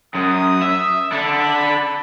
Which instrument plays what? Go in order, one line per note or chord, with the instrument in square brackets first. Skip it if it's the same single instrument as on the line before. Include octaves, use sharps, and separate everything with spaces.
[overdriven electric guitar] F#2 [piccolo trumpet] D#6
[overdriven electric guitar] E5
[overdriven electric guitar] D4 A4 [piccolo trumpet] B5